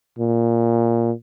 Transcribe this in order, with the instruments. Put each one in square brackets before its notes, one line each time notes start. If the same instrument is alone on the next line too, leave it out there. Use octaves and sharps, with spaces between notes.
[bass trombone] A#2